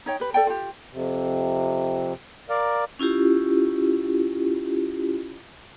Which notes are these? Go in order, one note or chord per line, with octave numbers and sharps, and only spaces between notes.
D#4 C#5 G5
G4 B4
A4 D5 G5 A5
F4 G4
F2 C3
A#4 D5 F5
C#4 E4 F4 G4